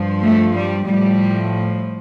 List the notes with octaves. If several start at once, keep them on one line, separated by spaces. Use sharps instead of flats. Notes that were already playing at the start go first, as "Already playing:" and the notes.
Already playing: G2 F3
A3
G3
A2 F3 G3